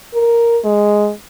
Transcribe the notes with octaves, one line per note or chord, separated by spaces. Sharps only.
A#4
G#3